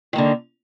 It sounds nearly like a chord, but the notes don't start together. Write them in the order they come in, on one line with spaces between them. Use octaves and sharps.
D#3 A#3 D3